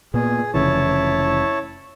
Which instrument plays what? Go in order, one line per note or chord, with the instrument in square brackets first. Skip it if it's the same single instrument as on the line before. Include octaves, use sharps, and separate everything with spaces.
[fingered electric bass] A#2 A#3 B3 [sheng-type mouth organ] G#4
[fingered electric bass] F1 C#3 E3 [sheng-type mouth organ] E4 C#5 A5